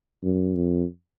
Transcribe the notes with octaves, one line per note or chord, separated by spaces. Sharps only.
F#2
F2